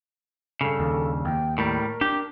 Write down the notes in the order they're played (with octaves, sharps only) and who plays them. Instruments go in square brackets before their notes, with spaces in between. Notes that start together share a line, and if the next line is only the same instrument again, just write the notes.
[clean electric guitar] G2 C#3 [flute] A4
[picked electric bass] D#2
[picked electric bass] D#2 [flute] G5
[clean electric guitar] A2 G3 [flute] A#4
[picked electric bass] D4 [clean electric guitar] G4